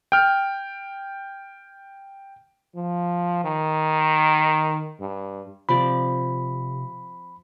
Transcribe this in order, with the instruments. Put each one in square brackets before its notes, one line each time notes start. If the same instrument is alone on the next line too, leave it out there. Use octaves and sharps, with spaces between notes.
[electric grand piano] G5 F6
[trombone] F3
D#3
G2
[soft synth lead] C3 [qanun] F3 C4 D5 [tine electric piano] B5